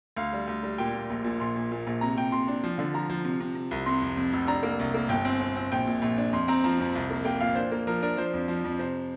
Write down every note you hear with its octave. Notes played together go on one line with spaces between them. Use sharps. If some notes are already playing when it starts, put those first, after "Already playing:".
D2 F5
G3
D2
G3
A#2 G5
A#2
A#1
A#2
A#1 C6
A#2
A#2
A#1
C3 A#5
C3 G5
C3 C6
D4
F3
D3
F3 A#5
F3
C3
C3
C3
C2
C3 C6
F2
F2
F1
D4 A#5
A#3
C2
A#3
G1 G5
C4
C4
C4
A#1 G5
A#2
A#1
D4
F2 C6
C4 A#5
F3 A#5
F2
C2
A#3
A#3 G5
A#2 F5
D4 C5
A#3
F3 A#4
D4 A#4
F3 C5
F2
F3
F2
C3 C5